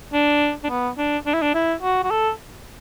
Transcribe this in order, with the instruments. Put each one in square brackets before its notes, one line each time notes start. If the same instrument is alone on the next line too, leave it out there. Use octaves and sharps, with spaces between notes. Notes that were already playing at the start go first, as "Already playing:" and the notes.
[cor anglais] D4
D4
B3
D4
D4
E4
D4
E4
F#4
F#4
A4